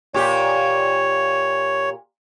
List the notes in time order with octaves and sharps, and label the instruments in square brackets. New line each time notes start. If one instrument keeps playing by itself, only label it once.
[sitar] A#2 G4 [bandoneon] C#5